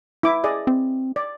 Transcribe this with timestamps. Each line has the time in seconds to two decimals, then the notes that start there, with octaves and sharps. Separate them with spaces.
0.23 E4 D6
0.44 G#4 D5 D#5
0.67 C4
1.16 D5